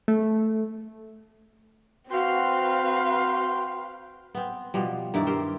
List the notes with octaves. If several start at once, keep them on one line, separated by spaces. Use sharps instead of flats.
A3
C4 F#4 B4 F5 G5 C6
B3 C4
B2 F3 G3
G2 D#3 E4 D5
G4 A#4 C5